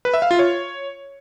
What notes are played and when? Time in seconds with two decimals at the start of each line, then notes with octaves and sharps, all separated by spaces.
0.05 B4
0.14 E5
0.22 F5
0.31 F4
0.39 C#5